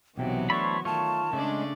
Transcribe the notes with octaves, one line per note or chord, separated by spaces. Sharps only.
B1 C3 E3 F#3 B3 G5
A3 D4 A4 C5 C#5 B5 C#6
D#3 A3 F4 C#5 A5
C#3 G#3 A3 C#4 D4 D5